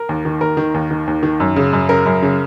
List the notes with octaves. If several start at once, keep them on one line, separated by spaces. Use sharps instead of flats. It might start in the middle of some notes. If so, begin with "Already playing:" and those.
Already playing: A#4
D#2
D#3
D#2 A#4
D#3
D#2
D#3
D#2
D#3
F#2
C#3
F#2
C#3 A#4
F#2
C#3